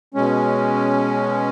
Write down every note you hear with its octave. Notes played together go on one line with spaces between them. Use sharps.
B2 G#3 C#4